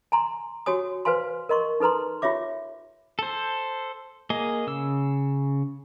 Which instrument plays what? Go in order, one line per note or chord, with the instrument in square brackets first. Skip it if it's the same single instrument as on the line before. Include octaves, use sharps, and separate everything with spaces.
[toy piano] G#5 A#5 C6
F#4 G4 C#5 G#5 D#6
B4 C5 F5 G#5 C6
A#4 D#5 C6 C#6
D#4 A4 B4 A#5 C6
F4 G4 C#5 E5 D6
[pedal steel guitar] A4 C5
A#3 G#4 D#5
C#3 E6